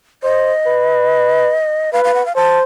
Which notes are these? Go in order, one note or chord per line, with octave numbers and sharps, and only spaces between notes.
C5 D#5
B4
B4 F5
F5
F#5
F5
C5 A5